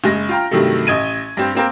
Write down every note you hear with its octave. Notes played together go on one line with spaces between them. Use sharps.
F#1 G#3 A#6
F4 G5 A#5
G2 C3 D#3 F#3 A3
A1 D#5 G#6 D#7
G2 C4 G4
A#3 C4 A#4